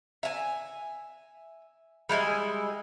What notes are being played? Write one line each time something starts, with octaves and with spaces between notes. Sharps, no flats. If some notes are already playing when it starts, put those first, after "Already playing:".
E5 G#5
G3 G#3 E4 G#5